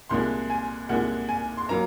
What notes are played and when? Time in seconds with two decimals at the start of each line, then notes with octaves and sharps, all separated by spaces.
0.09 C2 A#2 G#3 C6
0.50 G#5
0.89 C2 A#2 G#3 F#5
1.29 G#5
1.57 C6
1.69 F#3 A#3 A#5